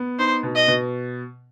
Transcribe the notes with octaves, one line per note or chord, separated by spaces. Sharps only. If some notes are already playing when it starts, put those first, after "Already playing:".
Already playing: B3
D#4 C5
B2
D#5
B2